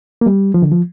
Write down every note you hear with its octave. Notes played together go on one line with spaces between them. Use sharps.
A#3
G3
F3
D3
F3